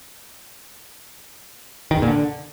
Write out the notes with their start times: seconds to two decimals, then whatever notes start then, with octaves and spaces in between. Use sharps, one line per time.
1.91 D#3
1.97 E2
2.02 A#2
2.08 D3